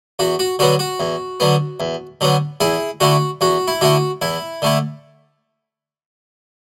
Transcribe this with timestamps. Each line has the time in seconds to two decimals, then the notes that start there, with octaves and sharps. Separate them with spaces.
0.19 E2 F#4
0.39 F#4
0.59 D3 F#3 B3 F#4
0.79 F#4
1.00 E2
1.40 D3 F#3 B3
1.80 E2
2.21 D3 F#3 B3
2.61 E2 E4 G#4
3.00 D3 A3 E4 F#4
3.41 E2 F#4
3.68 E4
3.81 D3 A3 E4 F#4
4.22 E2 E4
4.62 D3 A3 E4